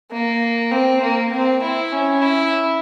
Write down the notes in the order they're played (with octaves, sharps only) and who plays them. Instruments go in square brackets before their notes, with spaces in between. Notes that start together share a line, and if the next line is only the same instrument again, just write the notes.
[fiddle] A#3
C4
A#3
C4
E4
C#4
E4